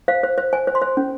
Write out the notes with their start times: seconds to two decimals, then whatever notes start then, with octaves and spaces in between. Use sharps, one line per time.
0.08 C5 F5
0.23 C5
0.38 C5
0.53 C5 G#5
0.67 C5
0.75 C6
0.82 C5
0.97 C#4